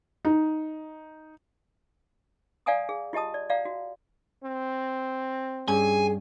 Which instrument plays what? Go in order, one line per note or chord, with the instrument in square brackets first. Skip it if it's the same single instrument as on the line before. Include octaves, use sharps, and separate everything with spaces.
[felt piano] D#4
[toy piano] D5 F5 F#5 G#5 A#5 D#6
G#4
F4 G4 D#5 A5 D#6
D5
D5 F5 F#5 A#5
F#4
[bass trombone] C4
[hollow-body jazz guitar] G2 C#4 [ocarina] G#4 [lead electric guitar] G#5